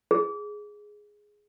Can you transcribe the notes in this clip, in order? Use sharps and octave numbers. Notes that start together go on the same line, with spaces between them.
G#4